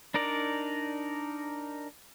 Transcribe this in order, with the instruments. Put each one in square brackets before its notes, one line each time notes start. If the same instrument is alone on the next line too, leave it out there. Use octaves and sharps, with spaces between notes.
[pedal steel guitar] D4 D#4 A#4 D5